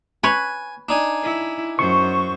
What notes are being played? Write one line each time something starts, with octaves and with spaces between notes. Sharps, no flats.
B4 C#5 G#5
D4 D#4 G#5
E4
F#2 C5 C#6